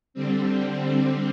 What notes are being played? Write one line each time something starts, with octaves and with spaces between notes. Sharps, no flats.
D3 G3 C4